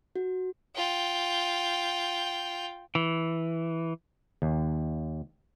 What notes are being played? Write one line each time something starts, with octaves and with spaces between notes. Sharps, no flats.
F#4
F4 G5
E3
D#2